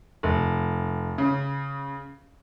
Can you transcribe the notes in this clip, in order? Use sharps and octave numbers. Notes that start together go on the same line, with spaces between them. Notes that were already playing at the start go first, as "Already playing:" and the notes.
F1
C#3